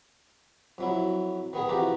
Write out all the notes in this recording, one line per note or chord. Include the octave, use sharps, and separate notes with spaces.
F2 F#3 E4
D#3 B3 G#4
C3 E3 F3 F#4 G4 A#5